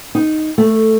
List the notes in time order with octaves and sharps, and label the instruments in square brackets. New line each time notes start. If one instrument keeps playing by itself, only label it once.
[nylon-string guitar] D#4
A3